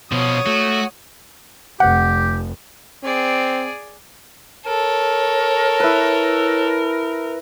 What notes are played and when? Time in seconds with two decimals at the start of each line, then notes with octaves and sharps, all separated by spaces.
0.12 B2 F3 B3 C#5 D#6
0.47 A3 F#4
1.80 F1 G4 F#5
3.04 C4 G#4 D5
4.66 A4 A#4 C#5
5.80 E4 B4